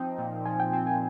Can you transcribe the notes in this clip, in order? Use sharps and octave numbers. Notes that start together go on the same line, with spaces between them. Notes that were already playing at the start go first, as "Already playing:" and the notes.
Already playing: F3 C4 D#4 G5
A#2
F3 G#5
G5
C4
G#5